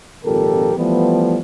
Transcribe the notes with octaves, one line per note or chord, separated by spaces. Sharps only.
G#1 F2 A#2 G4 A4 A#4
E3 F3 G3 A3 B3